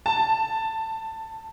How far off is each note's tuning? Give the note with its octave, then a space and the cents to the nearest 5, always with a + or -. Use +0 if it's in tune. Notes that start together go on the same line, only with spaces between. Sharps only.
A5 +5